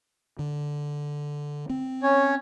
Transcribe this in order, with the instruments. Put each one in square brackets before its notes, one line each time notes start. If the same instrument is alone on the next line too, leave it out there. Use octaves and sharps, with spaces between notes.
[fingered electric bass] D3
C4
[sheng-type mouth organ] C#4 C#5